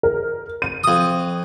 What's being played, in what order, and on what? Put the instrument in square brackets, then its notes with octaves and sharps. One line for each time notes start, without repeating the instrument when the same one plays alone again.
[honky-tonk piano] A#4
D#7
[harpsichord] F2 D#6